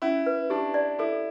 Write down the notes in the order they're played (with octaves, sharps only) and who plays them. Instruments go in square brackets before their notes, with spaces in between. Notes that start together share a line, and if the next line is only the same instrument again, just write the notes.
[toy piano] C#4 [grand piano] E4
[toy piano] B4
[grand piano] D4 [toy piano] G4
[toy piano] D5
[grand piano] E4 [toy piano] A4